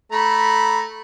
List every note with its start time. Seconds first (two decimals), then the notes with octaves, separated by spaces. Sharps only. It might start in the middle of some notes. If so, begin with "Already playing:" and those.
0.12 A3 A#5 B5